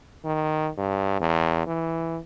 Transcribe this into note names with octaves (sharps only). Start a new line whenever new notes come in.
D#3
G2
E2
E3